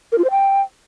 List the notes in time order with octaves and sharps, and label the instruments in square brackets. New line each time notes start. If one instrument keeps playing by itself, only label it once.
[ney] A#4
F4
C5
G5